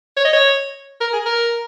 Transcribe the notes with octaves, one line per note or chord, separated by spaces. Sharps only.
C#5
D#5
C#5
A#4
G#4
A#4